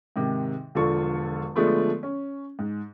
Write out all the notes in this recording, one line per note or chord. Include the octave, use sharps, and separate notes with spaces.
G#2 C3 D#3
E1 D3 F3 F4 A4 C#6
D3 F3 G#3 A3 B3
C#4
G#2